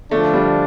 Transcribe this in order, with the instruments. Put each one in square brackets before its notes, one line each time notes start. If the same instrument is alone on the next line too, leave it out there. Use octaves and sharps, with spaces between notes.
[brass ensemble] D3 F3 D4 F4 [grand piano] A3
[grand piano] G3